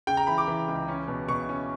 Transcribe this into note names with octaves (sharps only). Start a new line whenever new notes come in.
C#3 G5
A#5
E3 B5
D6
E3
C#2
C#4
B2
B2 C#6
C#4